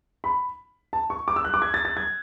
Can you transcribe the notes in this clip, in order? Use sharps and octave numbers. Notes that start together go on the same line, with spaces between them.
B5
A5
C#6
D6
E6
F#6
D6
G#6
A6
A6
G#6